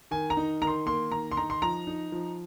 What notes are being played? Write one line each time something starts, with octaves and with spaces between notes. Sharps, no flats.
D#3 G#5
A#5
D#4
D#3 A#5
C6
A#3 C6
D#3 A#5
C6
D#4 A#5
C6
F3 A#5
D#4
F3